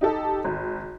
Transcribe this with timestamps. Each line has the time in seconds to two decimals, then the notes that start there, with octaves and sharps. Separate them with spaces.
0.01 D#4 G4 A4
0.44 G#1